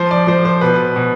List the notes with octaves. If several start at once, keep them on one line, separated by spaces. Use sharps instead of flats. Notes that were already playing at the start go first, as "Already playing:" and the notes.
Already playing: F3 C5
D5
F3 C5
C5
B2 B4
B2